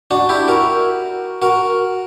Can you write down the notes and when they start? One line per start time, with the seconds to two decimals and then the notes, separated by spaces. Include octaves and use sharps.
0.11 D4 F#4
0.29 E4 G4
0.48 F#4 A#4
1.42 F#4 A#4